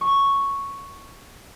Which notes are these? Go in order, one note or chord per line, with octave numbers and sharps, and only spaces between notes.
C#6